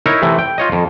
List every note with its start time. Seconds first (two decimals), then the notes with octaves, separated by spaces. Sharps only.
0.06 D#4 E4 A#4 C#5 E5
0.22 C3 E3 A3
0.39 G5
0.58 F4 C#5 D#5
0.72 F2